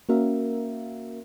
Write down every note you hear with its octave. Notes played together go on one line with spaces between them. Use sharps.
A#3 C#4 F#4 A#4 E5 F5